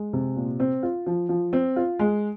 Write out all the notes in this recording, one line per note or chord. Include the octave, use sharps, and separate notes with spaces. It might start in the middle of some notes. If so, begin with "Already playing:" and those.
Already playing: G#3
C3
A#2
C4
F4
F3
F3
C4
F4
G#3